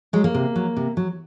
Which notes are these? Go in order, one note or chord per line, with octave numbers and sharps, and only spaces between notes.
F#3 G#3
A#3
C3
F#3
C3
F#3